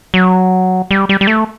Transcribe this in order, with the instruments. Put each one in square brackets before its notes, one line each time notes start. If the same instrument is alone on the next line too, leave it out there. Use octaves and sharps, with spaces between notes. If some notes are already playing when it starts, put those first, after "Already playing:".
[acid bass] F#3
G3
G3
G3
A3